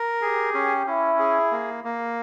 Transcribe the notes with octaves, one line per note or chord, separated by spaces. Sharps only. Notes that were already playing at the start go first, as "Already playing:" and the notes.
Already playing: A#4
G4 G#4
C#4
C#4 E4
G#4
A#3
A#3